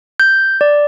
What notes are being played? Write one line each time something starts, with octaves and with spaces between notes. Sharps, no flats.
G6
D5